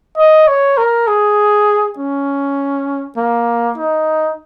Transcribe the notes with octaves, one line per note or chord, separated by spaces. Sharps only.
D#5
C#5
A#4
G#4
C#4
A#3
D#4